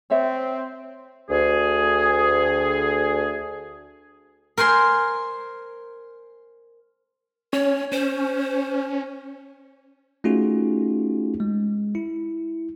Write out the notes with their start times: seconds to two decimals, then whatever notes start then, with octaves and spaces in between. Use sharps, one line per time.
0.10 C4 C#5 E5
1.30 D2 G#4
4.57 A#4 C5 G#5 C6
7.53 C#4 C#5
7.92 C#4 C5
10.24 A3 C#4 D#4 F4 F#4 G#4
11.40 G#3
11.95 E4